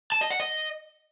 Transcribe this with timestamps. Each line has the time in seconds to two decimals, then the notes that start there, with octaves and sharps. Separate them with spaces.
0.12 A5
0.21 D#5
0.30 F#5
0.40 D#5